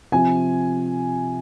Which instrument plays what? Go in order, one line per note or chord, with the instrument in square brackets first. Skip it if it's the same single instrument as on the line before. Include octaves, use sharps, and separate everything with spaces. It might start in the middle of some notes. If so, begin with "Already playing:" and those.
[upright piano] C3 F3 G#5